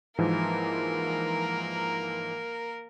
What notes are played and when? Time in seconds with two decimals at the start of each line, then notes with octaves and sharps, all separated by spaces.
0.18 G#2 E3 F3 A#3 A#4